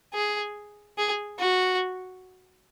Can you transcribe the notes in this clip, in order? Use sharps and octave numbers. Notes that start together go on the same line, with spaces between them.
G#4
G#4
F#4